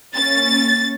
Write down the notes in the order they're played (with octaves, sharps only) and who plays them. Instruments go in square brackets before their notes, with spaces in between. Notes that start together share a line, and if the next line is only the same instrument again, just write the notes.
[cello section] A#3 C#4 [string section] A6